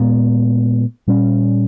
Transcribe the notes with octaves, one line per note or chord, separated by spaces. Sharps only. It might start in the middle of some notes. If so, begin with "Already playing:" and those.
Already playing: A#2 G#3 B3
A#2 G3 C#4